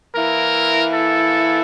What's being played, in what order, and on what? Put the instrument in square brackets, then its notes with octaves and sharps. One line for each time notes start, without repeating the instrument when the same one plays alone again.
[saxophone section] E3 A#3 E4 [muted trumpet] A#4
[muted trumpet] A4